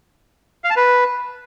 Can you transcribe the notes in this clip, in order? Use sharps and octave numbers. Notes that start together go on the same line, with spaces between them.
F5
A5
B4